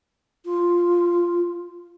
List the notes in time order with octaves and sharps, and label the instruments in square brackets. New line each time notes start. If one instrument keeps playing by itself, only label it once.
[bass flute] F4